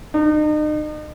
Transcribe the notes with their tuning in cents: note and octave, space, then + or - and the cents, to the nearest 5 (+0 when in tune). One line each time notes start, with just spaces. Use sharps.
D#4 -40